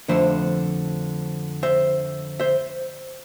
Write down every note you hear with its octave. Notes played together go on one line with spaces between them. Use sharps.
F2 D3 F3 A3 C5 E5
C5 E5
C5 E5